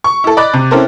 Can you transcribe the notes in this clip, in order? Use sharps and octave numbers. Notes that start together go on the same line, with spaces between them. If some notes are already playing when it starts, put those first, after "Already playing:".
C#6
E4 A4
D5 D#5 B5 D6 F#6 A6
C3
C4 C#4 E4 A4 A#4 C5